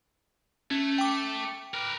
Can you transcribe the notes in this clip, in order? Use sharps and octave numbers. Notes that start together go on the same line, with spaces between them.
A3 C#4
G5 D6
A#4 B4